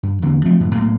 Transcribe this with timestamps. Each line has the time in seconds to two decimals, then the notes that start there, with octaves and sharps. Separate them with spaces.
0.03 G2
0.22 E2 D3 A#3 C4
0.45 F3 F#3 A3 C4
0.60 F#1 F#2 A2 D#3
0.74 B1 A2 A3 A#3